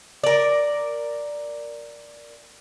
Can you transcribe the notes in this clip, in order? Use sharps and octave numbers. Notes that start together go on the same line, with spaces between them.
A#4 D5